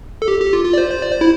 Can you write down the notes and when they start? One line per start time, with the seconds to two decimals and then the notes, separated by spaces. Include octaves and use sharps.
0.22 A4
0.28 G4
0.40 G4
0.53 F4
0.65 F4
0.73 D5
0.78 C5
0.90 C5
1.02 D5
1.11 C5
1.21 E4